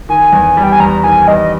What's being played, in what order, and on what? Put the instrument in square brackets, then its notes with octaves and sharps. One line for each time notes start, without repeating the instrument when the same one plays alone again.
[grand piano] D#3 [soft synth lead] G#5
[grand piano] E2
G3
[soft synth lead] G5
G#5
[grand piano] E2 [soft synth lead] A#5
[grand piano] D#3 [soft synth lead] G#5
[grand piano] E2 [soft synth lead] D#5